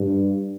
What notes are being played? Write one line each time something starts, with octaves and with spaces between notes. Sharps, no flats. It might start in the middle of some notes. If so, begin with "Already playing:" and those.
Already playing: G2